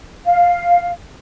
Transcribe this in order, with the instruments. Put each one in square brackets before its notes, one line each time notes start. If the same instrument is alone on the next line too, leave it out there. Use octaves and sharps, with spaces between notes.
[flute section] F5